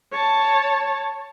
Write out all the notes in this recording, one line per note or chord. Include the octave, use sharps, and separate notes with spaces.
C#5 A5